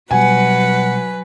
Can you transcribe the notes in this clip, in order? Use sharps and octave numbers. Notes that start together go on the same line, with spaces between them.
B2 F#3 G3 B4 F#5 G#5